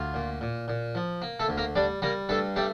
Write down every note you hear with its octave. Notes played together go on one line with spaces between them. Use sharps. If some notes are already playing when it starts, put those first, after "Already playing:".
Already playing: D2 F4
A#2
A#2
A#2
F3
A#3
A3 A4
D2
A#3 A#4
G3 D4 D5
G3 A#3 A#4
G2 A3 A4
G3 A3 G4